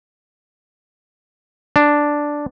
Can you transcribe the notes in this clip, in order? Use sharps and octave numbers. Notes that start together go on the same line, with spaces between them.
D4